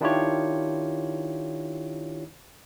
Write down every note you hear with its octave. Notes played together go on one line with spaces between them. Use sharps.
D#3 D4 E4 F4 G4 C#5